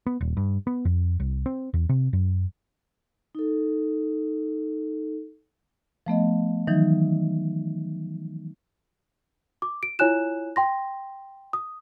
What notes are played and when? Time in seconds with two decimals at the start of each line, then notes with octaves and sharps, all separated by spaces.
0.06 B3
0.21 D#1
0.37 G2
0.67 B3
0.85 F2
1.20 C2
1.46 C4
1.74 E2
1.89 C3
2.13 F#2
3.35 D#4 A4
6.06 F3 A3 B3 D#5
6.67 D#3 E3 F#3 D#4
9.62 D6
9.83 D7
9.99 E4 F4 C#5 G#5 F#6 E7
10.56 G5 C6 A#6
11.53 D#6